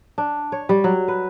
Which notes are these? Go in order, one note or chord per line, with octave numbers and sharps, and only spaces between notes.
D4
C#5
G3
F#3
B4